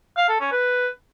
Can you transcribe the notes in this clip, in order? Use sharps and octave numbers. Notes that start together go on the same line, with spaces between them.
F5
A4
C#4
B4